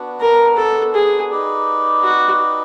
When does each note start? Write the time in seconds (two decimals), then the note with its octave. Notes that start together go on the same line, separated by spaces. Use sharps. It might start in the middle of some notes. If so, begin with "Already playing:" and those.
Already playing: B3 D4 F#4
0.21 A#4
0.57 A4
0.94 G#4
1.31 D#4 G4 B4 D5
2.04 F#4